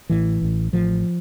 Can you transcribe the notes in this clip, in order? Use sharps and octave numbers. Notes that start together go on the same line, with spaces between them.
A1 A2 E3
A1 A2
A1 A2 F3